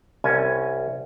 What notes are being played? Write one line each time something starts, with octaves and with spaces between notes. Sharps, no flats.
C2 C#4 G#5